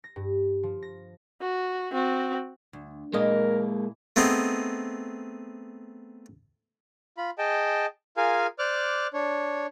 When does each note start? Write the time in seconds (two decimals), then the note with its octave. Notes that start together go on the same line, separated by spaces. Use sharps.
0.04 A#6
0.16 G2
0.63 F3
0.82 A#6
1.41 F#4
1.92 C4 F#4
2.73 D2
3.13 A#2 E3 G#3 A#3 A#4 D#5
4.16 A3 B3 C4 D#4 G#4
7.18 F4 B5
7.38 G#4 D#5 G5 A5
8.17 F4 G#4 A#4 F5 G#5
8.59 C5 D5 D6 F6 F#6
9.13 D4 C#5